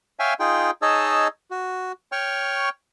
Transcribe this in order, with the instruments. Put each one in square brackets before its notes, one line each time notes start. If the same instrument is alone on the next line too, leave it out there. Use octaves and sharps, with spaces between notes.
[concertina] C#5 E5 F5 G5 G#5
D#4 F4 G#4 G5
D#4 G#4 C#5 D#5 A5 E6
F#4
C#5 G5 C#6 F6